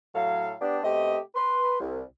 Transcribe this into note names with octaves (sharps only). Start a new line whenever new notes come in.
A2 F#3 A4 F5
B3 D4 G4
B2 A3 C4 G4 D#5
B4 C6
C2